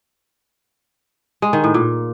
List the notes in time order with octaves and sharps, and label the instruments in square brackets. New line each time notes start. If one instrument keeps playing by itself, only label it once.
[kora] G#3
D#3
A2
A#2